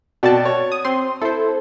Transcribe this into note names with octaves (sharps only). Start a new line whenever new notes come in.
B2 F#4 D5 G5 A5
C#5
D#6
C4 C6
E4 A4 C5